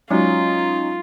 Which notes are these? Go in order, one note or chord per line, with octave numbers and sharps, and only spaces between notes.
F#3 G#3 C#4 D#4 F4 F#4